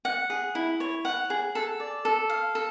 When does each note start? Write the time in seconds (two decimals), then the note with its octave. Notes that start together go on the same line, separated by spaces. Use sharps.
0.05 F#5
0.30 G#4
0.55 E4
0.80 C#5
1.05 F#5
1.30 G#4
1.55 A4
1.80 D5
2.05 A4
2.30 F5
2.55 A4